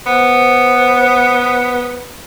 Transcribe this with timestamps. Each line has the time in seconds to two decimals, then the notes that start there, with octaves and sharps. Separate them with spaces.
0.06 B3 C5